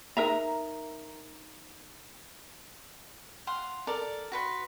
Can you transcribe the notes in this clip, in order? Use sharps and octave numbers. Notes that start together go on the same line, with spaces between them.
D#4 A#4 E5 A#5
F5 F#5 C6
A4 A#4 D5
F#4 B4 C6